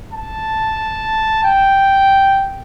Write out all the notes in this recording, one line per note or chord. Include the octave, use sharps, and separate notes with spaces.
A5
G5